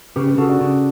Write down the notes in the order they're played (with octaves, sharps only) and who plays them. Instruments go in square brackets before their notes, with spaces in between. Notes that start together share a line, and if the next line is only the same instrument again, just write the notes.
[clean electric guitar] C#3 [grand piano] G4 B4
[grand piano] G4 B4
[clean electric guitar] C#3 [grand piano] F#4 A4
[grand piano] D4 F#4
[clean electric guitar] C#3